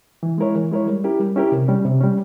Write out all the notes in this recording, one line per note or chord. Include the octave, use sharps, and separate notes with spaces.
E3
G#3 E4 A#4 C#5
E3
G#3 E4 A#4 C#5
G3
C#4 E4 G4 A#4
G3
C#4 E4 G4 A#4
C3
G3 C#4
C3
G3 C#4